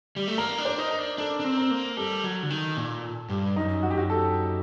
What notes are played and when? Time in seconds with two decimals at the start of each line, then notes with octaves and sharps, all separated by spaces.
0.16 G3
0.28 A3
0.38 A#3 A#4
0.58 D4
0.65 C5
0.78 D#4
0.91 A#4
0.98 D4
1.18 D4 A4
1.40 D4
1.44 C4
1.57 A#4
1.71 A#3
1.97 G3 A4
2.24 F#3
2.43 D3
2.50 D#3
2.77 A#2
3.30 G2
3.56 F#2 D#4
3.83 F#4
3.90 G4
3.97 F#4
4.10 A4